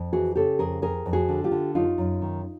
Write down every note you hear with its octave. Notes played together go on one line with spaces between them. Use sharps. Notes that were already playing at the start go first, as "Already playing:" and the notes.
Already playing: F2
E3 F#4 G#4
C#3 G4 A4
F2 G#4 A#4
F2 G#4 A#4
F2
F#4 G#4
D3
F4 G4
D3
F#2 D#4 F4
F#2
D#3